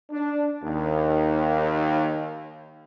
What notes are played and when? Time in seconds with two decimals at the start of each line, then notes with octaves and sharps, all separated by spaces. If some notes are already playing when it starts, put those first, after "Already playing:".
0.10 D4
0.63 D#2